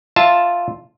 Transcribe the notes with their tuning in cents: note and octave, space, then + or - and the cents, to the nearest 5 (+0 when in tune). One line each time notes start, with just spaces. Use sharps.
F4 +0 E5 +0 A5 +0